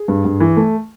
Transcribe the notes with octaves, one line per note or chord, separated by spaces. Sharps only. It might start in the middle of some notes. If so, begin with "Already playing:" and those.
Already playing: G#4
G2
G2
E3
A3